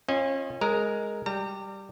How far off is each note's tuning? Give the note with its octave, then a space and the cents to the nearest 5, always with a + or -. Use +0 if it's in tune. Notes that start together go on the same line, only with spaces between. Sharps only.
C#4 -35 F4 -10 D#5 +0
G#3 +0 A#4 +0 A#5 +0
G3 +0 A#5 -35